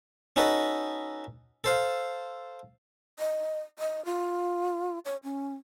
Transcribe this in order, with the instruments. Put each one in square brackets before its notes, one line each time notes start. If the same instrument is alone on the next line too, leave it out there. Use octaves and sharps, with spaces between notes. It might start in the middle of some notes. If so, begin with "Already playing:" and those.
[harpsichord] C#4 D#4 F#4 A4 B4 D#5
A4 C5 F5
[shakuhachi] D#5
D#5
F4
C#5
C#4